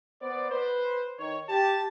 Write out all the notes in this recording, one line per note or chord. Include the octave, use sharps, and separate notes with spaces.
B3 C5 D5
B4 C5
D#3 D#4 C#5
G4 A5